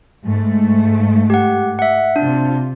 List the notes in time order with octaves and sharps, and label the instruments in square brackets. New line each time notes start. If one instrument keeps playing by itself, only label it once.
[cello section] G#2 A3
[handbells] G4 F#5
E5 F#5
[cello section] C3 F4 [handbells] D4